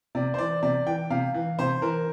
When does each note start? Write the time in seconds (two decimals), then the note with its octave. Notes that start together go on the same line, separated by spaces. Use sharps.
0.15 C3 D5
0.34 C5
0.38 E3 D5
0.63 C3 D5
0.87 E3 G5
1.10 C3 F5
1.34 E3
1.58 C3 C5
1.82 E3 A#4